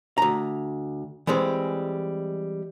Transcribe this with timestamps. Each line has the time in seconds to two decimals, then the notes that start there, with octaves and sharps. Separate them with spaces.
0.18 D2 A#5
1.27 E3 G3 G#3 C4